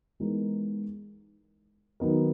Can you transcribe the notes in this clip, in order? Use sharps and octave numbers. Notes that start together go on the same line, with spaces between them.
E3 G#3 B3 D#4 A#4
D#3 F#3 B3 D#4 A#4